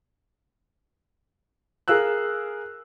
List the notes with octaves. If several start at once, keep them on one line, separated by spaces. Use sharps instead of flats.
G#4 A#4 F5 E6 F#6